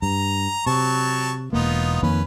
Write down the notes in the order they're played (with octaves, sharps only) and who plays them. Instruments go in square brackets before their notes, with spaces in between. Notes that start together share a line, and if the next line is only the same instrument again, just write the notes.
[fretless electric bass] G2 [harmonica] A#5
[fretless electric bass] C3 [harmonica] F#3 A5 C#6
[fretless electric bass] E1 A#3 [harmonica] B3 D#4 F4
[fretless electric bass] F2 D#3 A#3 [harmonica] C#4 B4